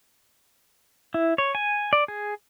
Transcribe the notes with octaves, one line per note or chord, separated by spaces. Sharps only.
E4
C#5
G#5
D5
G#4